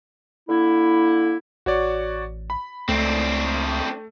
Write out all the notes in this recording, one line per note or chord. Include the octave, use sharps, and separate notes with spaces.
D3 A#3 E4
A1 F#4 C#5 D5
B5
C#2 A3 C4 D4